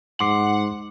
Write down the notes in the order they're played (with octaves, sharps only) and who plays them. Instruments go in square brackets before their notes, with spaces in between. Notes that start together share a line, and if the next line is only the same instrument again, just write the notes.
[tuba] G#2 [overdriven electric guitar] F#5 [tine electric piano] C6 D6 C7